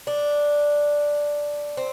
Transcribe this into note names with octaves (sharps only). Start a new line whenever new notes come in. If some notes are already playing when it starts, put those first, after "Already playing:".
D4
C4